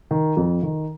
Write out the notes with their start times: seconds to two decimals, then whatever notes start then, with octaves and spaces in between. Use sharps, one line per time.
0.11 D#3
0.37 F2
0.63 D#3